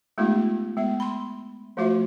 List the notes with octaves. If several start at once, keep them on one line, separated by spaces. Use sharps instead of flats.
G#3 A3 B3 D#4 F4 G4
G#3 B3 E5
B5 C6
F3 A3 F4 F#4 C5 E5